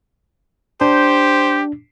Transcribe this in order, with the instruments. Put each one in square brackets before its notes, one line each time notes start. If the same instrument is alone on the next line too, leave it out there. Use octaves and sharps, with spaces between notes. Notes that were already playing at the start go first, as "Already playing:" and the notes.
[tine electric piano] D4 [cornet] G4 [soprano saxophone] C5